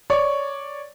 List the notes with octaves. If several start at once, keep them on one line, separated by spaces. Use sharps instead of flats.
C#5 D5 C#6